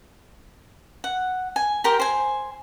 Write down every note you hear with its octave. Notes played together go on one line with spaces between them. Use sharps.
F#5
G#5
G4 A#4 C5 G5
C5 G#5